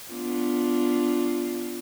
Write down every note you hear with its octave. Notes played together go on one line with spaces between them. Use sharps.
B3 D4 F4